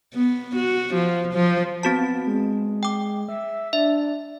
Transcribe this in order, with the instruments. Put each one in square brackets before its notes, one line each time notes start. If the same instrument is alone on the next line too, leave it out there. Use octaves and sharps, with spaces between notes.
[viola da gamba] B3
F#4
F3
F3
[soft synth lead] B3 [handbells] C4 F#4 A5
[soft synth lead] G#3
[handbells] G5 D6
[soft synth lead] E5
[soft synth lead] D4 [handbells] E5